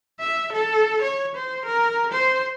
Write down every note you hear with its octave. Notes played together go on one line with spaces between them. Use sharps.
E5
A4
C#5
C5
A#4
C5